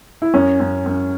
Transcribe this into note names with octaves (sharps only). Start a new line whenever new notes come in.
E4
F#2 C#4
F#2
F#2